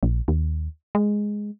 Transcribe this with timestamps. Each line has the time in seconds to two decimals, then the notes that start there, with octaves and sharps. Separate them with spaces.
0.03 A#1
0.28 D#2
0.95 G#3